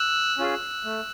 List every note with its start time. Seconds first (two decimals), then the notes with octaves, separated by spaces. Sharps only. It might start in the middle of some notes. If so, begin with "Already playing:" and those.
Already playing: E6 F#6
0.38 C#4 F4 G#4
0.84 A3